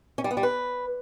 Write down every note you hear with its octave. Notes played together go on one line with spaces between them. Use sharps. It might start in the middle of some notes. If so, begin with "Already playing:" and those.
C#4
G3
B3
G3
B4